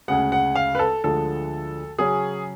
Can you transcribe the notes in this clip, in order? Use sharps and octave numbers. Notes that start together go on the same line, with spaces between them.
D2 C#3 G#3 F#5
F#5
F5
B4
A4
D2 D3 F3 G#3 A4
C#3 F#3 C#4 G#4